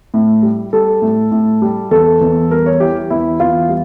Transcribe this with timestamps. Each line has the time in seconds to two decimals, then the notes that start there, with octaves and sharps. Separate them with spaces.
0.14 A2
0.43 G3
0.73 G3 A4
1.02 A2
1.31 A2
1.62 G3
1.91 E2 A4
2.21 E2
2.50 G3 A#4
2.66 C#5
2.80 E3 G4
3.10 E2 E4
3.40 E2 F4
3.69 G3